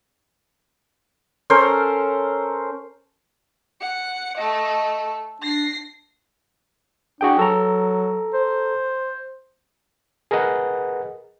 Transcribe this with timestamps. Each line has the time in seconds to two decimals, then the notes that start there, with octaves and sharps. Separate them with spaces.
1.50 C#4 A4 A#4 C5
3.80 F#5 C#7
4.38 A3 A4 D#5
5.42 D4 A#6 C7
7.21 D4 F#4 G#4 G5
7.39 F#3 A4 A#5
8.34 C5
10.31 G#4 A#4 B4 D#5 F#5